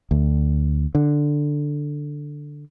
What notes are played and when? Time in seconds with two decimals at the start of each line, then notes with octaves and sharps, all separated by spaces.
0.11 D2
0.95 D3